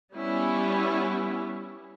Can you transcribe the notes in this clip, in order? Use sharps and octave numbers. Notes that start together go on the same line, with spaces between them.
G3 B3 C#4 E4